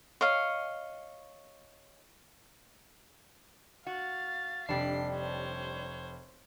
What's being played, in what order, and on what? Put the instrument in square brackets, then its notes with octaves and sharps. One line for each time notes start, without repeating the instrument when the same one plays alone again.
[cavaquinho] C#5 D#5 F5
[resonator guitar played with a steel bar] F#4 [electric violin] F5 A6
[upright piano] F1 [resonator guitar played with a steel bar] G3 D4 [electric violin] C7
[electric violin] C5 C#5